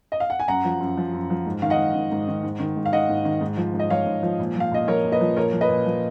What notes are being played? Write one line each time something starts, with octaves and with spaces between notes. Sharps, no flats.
D#5
F5
F#5
G#5
F#2 F#5 A#5
F3
F#2
F3
F#2
F3
G#2
D#3 F5
D#5 F#5
G#2
D#3
G#2
D#3
G#2
D#3
G#2
F5
D#3 D#5 F#5
G#2
D#3
G#2
F3
G#2
D#5
F3 C#5 F5
G#2
F3
A#2
F3 F5
A#2 D#5
F3 A#4 C#5
A#2
B4 D#5
F3
A#2 A#4 C#5
F3
B4 D#5
A#2
F3